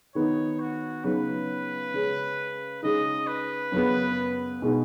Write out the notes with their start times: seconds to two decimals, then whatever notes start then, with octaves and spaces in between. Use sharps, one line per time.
0.15 D#3 B3 D#4 C#5
0.60 F#4
1.04 C#3 F#3 B3 D#4 B4
1.94 C#3 G#3 C#4
2.83 C#3 G#3 D#4 D#5
3.27 B4
3.72 F#2 C#3 B3
4.62 B2 G#3 B3 D#4